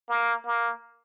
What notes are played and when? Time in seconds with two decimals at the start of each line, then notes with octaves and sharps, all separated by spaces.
0.09 A#3
0.46 A#3